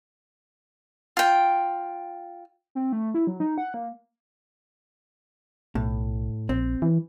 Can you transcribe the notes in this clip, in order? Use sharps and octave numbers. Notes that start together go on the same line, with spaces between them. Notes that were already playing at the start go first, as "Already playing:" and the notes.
F4 G5
C4
A3
E4
F#3
D#4
F#5
A#3
B1 A2
A#1 C4
E3